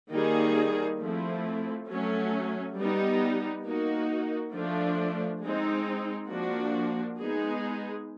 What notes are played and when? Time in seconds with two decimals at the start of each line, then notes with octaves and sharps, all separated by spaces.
0.12 D#3 G3 A#3 D#4 G#4
1.00 F3 A3 C4 E4
1.88 F#3 A3 C#4
2.77 G3 B3 D#4
3.65 A#3 D#4 F#4
4.54 F3 A3 D4
5.42 G#3 C4 D#4
6.30 F3 A#3 D4 F#4
7.19 G#3 B3 D#4 G#4